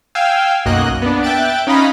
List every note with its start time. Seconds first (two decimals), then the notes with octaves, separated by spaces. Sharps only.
0.15 F5 G5 G#5 E6
0.66 B1 F#2 A#3 F#4 D#5 F#6
1.02 B3 D4
1.23 E5 G5 F#6 A6 D7
1.67 C#4 D#4 F4 D#5 B5